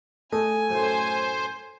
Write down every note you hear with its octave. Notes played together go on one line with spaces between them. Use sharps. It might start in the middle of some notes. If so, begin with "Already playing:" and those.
A3 D#5 G#5
F#2 A2 C5